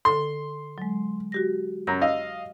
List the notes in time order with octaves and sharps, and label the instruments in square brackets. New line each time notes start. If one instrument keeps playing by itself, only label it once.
[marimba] D3 A4 [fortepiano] C6
[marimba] F#3 G#3
F#4 G4 A#6
[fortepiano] F#2 [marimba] A#5 A#6
[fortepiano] D#5 F5 [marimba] E6